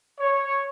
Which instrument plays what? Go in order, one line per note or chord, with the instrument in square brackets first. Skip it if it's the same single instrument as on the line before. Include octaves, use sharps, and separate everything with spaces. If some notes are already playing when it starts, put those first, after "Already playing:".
[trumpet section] C#5